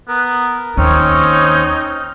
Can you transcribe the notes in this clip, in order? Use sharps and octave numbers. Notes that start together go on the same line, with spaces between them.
B3 A#4
D#2 C4 C#4 D#4 C#5